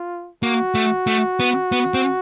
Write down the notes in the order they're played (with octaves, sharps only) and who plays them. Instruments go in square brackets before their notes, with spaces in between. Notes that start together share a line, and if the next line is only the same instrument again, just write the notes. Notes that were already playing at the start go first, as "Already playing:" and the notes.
Already playing: [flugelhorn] F4
[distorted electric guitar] A#3 [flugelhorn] F#4
[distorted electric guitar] A3
A3
B3
B3
C4